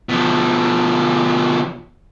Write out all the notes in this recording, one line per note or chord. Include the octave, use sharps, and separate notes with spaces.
B2 F3